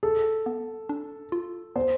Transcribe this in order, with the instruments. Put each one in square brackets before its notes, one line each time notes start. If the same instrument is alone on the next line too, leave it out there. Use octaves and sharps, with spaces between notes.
[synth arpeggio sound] G#4 [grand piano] A4
[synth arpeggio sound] B3
D4
F4
[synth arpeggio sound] B3 [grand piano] C5